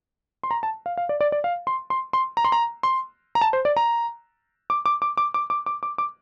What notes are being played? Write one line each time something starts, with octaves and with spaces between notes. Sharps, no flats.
C6
A#5
A5
F5
F5
D5
D5
D5
F5
C6
C6
C6
A#5
C6
A#5
C6
A#5
A5
C5
D5
A#5
D6
D6
D6
D6
D6
D6
D6
D6
D6